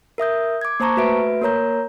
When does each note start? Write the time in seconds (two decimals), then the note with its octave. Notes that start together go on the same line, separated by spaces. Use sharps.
0.18 A#4 E5 D#6 G6
0.61 D6 G#6
0.80 A#3 C5 A5 A#5 C#6
0.96 A3 F#4 B4 E5 D7
1.42 A#3 A#4 C#5 A#5 G6